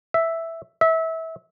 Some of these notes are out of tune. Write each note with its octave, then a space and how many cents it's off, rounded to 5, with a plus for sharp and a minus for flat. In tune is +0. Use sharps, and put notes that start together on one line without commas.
E5 +0
E5 -25